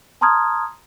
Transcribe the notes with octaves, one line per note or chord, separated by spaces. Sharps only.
A5 A#5 C6 D#6 F6 G#6